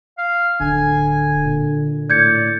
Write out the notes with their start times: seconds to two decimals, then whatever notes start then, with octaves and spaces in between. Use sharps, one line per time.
0.18 F5
0.61 D1 D3 G#5
1.45 A#2
2.10 A2 D5 G6 G#6 C#7